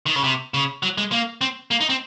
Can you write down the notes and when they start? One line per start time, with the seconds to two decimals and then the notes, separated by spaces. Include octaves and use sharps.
0.06 D#3
0.16 C#3
0.24 C3
0.54 C#3
0.83 F#3
0.98 G#3
1.12 A#3
1.41 C4
1.71 A#3
1.81 D#4
1.89 C4